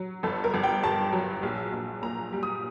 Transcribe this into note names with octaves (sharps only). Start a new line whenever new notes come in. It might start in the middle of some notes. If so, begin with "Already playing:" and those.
Already playing: F#3
G1 A4
A#4
G1
G5
G2 A5
F#3
A#1
A#1
A#2 A#5
G3
D#6